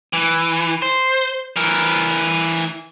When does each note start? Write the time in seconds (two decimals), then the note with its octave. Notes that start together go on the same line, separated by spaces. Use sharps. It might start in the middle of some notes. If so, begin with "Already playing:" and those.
0.13 E3
0.82 C5
1.56 E3 A#4